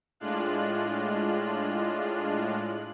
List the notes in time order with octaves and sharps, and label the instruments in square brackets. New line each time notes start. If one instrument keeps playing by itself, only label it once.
[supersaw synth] A2 G#3 D4 F4 F#6